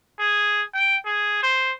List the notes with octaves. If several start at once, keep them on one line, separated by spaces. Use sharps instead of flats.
G#4
G5
G#4
C5